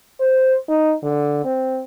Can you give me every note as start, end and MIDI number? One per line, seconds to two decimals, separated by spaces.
0.20 0.55 72
0.69 0.94 63
1.03 1.41 50
1.45 1.83 60